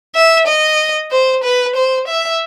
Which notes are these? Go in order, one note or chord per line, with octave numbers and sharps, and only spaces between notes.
E5
D#5
C5
B4
C5
E5